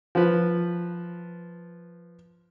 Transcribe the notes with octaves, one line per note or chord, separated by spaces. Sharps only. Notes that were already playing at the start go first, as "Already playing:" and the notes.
F3 B4